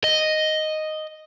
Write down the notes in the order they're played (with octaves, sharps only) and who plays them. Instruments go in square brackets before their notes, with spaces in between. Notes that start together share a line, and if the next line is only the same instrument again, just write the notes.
[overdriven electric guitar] D#5